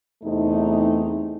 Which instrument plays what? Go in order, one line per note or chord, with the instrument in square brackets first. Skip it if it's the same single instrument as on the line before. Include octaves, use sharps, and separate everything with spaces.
[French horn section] E2 C3 A3 D#4